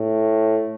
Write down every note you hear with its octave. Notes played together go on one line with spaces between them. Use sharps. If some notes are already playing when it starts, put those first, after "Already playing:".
Already playing: A2